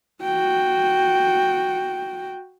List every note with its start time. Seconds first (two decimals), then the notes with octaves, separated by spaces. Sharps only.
0.23 F#4 G5